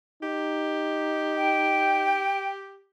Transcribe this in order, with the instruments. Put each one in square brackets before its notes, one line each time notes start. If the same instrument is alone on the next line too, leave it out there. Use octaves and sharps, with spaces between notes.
[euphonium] D#4 [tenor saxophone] G4
[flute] G5